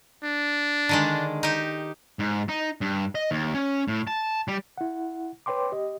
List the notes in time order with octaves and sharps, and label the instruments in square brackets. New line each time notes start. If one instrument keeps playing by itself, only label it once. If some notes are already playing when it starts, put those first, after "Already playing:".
[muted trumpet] D4
[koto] D3 D#3 G#3
D#4 G4
[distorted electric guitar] G#2
D#4
G2
D#5
D#2
C#4
A2
A5
G3
[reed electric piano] E4 F#5
B4 C#5 G5 C6 D6
G4 D#5